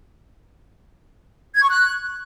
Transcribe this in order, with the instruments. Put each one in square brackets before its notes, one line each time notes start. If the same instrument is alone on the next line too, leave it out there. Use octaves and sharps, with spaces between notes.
[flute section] G#6
C#6
F#6